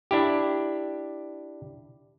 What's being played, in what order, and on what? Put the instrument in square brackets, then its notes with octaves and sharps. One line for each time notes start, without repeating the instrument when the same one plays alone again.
[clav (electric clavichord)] D4 E4 G4